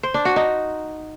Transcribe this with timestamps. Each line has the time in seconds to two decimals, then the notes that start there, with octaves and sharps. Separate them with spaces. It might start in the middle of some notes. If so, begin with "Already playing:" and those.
0.03 C5
0.14 D4
0.25 F#4
0.36 D#4